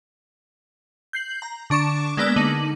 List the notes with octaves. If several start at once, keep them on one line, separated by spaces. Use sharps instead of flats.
G6 C7 F#7
A#5
D3 D4 C#6 D6 E7
G#3 A#3 B3 D5 E6
D3 D#4 F#7